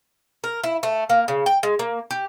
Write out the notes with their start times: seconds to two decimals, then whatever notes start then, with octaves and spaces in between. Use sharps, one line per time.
0.44 A#4
0.64 E4
0.83 A3
1.10 A#3
1.28 C#3
1.46 G5
1.63 G#3
1.79 A#3
2.11 G4